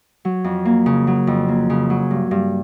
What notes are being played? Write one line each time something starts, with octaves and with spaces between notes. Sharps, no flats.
F#3
F2
A#3
C#3
F#3
F2
A#3
C#3
F#3
G2
G2